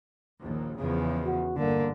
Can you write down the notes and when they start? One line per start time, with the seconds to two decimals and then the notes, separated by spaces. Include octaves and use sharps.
0.40 A#1 D#2
0.80 E2 C#3 F3
1.24 F#4
1.57 G1 D3 A#3